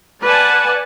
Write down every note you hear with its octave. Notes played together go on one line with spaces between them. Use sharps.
B4 D5 F#5 G#5 A5